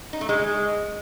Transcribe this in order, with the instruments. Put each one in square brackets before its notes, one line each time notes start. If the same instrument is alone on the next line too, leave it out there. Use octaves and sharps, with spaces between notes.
[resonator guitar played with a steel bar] D#4
A3
G#3